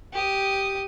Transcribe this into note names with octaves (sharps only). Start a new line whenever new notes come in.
G4 D#6